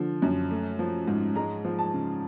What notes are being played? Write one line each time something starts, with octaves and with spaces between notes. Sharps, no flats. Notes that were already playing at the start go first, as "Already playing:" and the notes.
Already playing: D3 F3
F#2
A3
F3
G#2
G#3 A#5
F3
A5
C#3